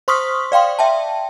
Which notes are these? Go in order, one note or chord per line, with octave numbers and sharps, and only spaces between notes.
C5 C6 C#6 D#6 F6 B6
D5 F5 G5 C6
E5 G5 A5